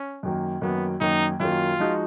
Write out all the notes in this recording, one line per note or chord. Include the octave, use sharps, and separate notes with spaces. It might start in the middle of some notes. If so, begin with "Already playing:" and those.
Already playing: C#4
F#2 D#3 F#3 A#3
F#2 D#3 F#3 A#3 B3
F#2 D#3 F#3 A#3 D#4
F#2 D#3 F#3 A#3 F4
F3 G#3 D#4 F#4